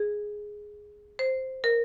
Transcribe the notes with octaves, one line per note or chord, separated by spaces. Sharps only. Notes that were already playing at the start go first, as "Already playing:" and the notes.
Already playing: G#4
C5
A#4